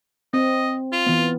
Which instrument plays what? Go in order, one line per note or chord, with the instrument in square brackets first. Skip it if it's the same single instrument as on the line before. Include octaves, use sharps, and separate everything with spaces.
[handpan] C4 [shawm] D#5
[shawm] F4
[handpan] E3 B3